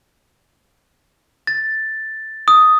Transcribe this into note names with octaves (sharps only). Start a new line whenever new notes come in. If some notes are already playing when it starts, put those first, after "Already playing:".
A6
D#6